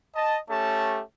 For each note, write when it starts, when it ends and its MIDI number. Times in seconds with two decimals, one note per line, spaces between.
0.15 0.38 75
0.15 0.38 81
0.49 1.01 57
0.49 1.01 61
0.49 1.01 67
0.49 1.01 81